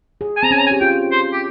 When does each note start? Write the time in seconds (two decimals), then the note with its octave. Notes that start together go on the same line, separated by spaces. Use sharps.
0.21 G#4
0.37 G#5
0.43 C4 A#5
0.51 C#4 G#5
0.59 A#5
0.67 G#5
0.71 G4
0.81 F4 G5
1.12 C5
1.32 G4